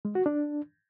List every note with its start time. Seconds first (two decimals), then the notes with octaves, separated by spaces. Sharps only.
0.05 G#3
0.15 F#4
0.26 D4